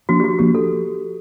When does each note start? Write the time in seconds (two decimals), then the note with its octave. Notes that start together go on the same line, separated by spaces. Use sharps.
0.09 F3 A#3 D4 F#4
0.20 G4
0.24 F#4
0.39 F3 A#3 D4 G4
0.55 A4